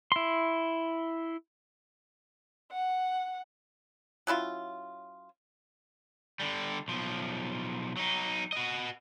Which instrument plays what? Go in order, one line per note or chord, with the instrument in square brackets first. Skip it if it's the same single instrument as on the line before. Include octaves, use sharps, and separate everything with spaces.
[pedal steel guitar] E4 C6
[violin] F#5
[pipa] F#3 C#4 E4 F4
[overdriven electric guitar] D3 G3
B1 F3
F#3 D#4
F#4 D#5